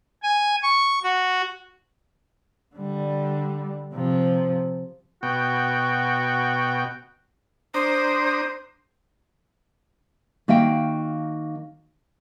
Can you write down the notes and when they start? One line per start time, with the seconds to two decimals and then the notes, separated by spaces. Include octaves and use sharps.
0.23 G#5
0.63 C#6
1.03 F#4
2.75 D3 G3
3.93 C3 F3
5.23 B2 F#4 G5
7.74 D4 C5 A#5 D#6
10.48 D#3 A#3 F#4 E5 F5 G5